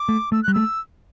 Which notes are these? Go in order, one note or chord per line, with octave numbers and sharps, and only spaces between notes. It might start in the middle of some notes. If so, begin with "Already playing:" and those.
Already playing: D6
A3
A3 E6
G3 F#6
A3 E6